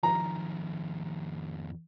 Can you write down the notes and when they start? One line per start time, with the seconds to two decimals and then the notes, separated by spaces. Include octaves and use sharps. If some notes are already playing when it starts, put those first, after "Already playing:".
0.03 F2 D#3 A#5